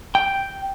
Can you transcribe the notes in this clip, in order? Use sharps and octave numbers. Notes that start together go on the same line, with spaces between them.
G5